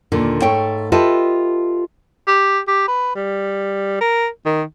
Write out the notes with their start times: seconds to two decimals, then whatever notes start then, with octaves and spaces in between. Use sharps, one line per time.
0.12 D#2 A#2 D3
0.42 G#2 A3 C#5 G5
0.92 F4 G4 A4 B4 D#5 E5
2.27 G4
2.68 G4
2.88 B4
3.16 G3
4.01 A#4
4.45 D#3